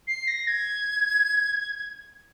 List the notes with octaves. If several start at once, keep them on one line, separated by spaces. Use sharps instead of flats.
C7
A#6
G#6